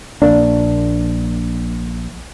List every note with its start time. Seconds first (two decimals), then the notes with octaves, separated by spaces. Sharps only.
0.22 A#1 A#3 D4